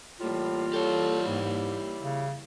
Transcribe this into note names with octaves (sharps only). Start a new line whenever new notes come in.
A2 E3 G3 A#3 F4
G4 A4 C#5
G#2 E4
C#3